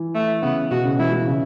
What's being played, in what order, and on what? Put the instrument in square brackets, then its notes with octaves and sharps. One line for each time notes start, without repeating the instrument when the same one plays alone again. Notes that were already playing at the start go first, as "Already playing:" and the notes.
Already playing: [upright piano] E3
[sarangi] A3
[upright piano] C#3 [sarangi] B3
[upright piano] B2 [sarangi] F#4
[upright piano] C#3
[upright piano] E3 [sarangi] E4
[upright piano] E3
C#3